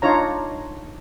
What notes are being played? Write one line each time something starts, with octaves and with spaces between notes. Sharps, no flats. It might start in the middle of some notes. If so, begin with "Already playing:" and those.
D4 D#4 F4 C#5 A#5